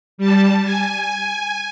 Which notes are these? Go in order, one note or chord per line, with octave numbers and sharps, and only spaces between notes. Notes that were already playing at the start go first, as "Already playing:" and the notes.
G3 A5
G#5